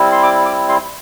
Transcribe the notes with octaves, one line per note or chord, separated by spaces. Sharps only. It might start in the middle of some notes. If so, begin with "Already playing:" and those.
Already playing: G3 C4 E4
C6
D6
D6
C6